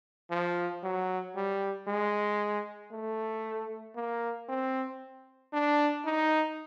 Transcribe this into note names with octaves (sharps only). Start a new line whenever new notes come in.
F3
F#3
G3
G#3
A3
A#3
C4
D4
D#4